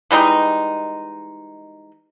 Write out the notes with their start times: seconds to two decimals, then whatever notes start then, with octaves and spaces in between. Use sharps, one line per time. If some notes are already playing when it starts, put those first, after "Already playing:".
0.11 E3 G3 G#3 D#4